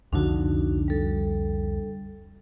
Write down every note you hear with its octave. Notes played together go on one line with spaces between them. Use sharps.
C2 F2 D3 D4 D#4 F#4
G3 A4